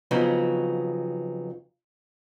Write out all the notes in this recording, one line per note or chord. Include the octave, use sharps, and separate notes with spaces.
F2 C#3 F#3 B3 D#4